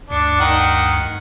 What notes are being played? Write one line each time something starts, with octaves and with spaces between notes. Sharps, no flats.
D2 G2 D4 C#7
D#3 F#5